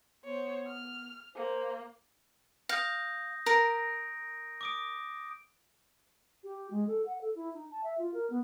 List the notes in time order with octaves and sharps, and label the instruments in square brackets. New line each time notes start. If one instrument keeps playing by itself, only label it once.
[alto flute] B3 [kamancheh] C5 C#5
[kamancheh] F6
[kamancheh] A#3 [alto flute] C5
[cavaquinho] F5 [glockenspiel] D#6 G6 A#6
[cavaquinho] A#4 [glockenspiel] A#6 D7
[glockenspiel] D6 D#6 D7
[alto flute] G4
G#3
A4
F#5
A4
E4
D#4
A5
E5
F4
A#4
B3